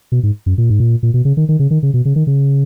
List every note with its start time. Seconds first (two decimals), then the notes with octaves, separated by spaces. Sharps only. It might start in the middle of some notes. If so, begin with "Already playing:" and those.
0.12 B2
0.23 G#2
0.46 F#2
0.58 A#2
0.70 G#2
0.80 A#2
1.03 A#2
1.14 B2
1.25 C#3
1.37 D#3
1.49 D#3
1.59 C#3
1.71 D#3
1.83 C#3
1.94 B2
2.05 C#3
2.16 D#3
2.27 C#3